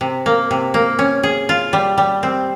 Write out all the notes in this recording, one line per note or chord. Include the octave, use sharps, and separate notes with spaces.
C3
A#3
C3
A#3
C#4
G#4
F4
G3
G3
C4